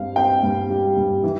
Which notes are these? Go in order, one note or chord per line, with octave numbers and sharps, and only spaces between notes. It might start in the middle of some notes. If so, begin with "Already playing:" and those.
Already playing: G2 C4 F5
C4 G5
G2
G3
G2
E3